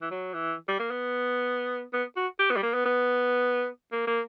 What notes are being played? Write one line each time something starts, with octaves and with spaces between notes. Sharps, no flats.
E3
F#3
E3
G3
A#3
B3
B3
F#4
G4
B3
G3
A#3
B3
B3
A#3
A#3